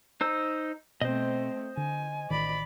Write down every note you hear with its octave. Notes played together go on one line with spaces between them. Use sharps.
D#4 C5 E6
B2 A3 C4 C5 D#5
D3 G#5
A1 D#3 D5 B5